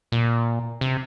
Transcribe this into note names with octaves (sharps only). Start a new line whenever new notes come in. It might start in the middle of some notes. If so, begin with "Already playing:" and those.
A#2
C3